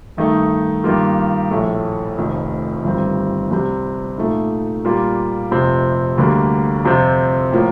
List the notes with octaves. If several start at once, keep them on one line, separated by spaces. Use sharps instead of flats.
G2 D#3 A3 D#4
G2 D#3 G3 A#3 F4
A#1 A2 A3
F1 F2 D#3
G1 G2 D#3 G3 C4
C2 C3 G3 C4
A#2 A3 D#4
A#2 G3 A#3 F4
F1 F2 C3 F3 C4
D2 D3 G3 A#3
F2 C3 F3 C4 F4
A2 F3 A#3